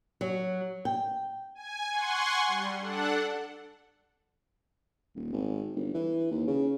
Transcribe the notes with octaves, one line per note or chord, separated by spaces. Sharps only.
F#3
G5
G#5
F#5 G#5 C6 C#6
G3
D4 A4 F#5
D#1
G#1
G1
E3
D#2
C#3